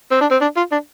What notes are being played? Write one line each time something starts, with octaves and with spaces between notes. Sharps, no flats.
C4
D4
C4
D4
F4
D4